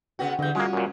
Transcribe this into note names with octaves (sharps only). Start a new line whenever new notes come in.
C#3 B3 F#4 G5
E2 D3 G3 G6
G3 G#3 A#3 C#4 F4 F#4
F#2 A#2